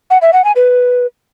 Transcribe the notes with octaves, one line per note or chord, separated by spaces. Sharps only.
F#5
E5
F#5
G#5
B4